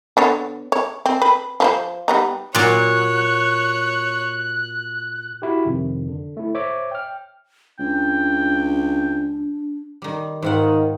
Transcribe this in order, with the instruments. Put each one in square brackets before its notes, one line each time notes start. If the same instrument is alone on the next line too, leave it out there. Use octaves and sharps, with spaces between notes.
[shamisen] D3 B3 C#5
C#5
C4
B4
F3 B4 C5
G3 B3 D#4
[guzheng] A#2 F#3 [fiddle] C#5 [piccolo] F#6
[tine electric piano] E4 F#4 G4
F2 C3 D#3
D3
A3 E4
C5 C#5 E5 D6
G5 F6
[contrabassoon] C#2 [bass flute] D4 [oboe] G5
[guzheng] D#3 G3
[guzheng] G#2 F4 F#5 [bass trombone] D#3